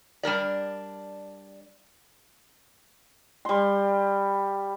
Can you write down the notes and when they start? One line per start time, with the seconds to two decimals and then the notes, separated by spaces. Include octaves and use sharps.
0.23 G3 D4 A#4 D5
3.45 G3 C6